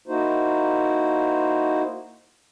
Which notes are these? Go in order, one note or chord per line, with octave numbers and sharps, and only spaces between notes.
A#3 D#4 E4 F#4 C5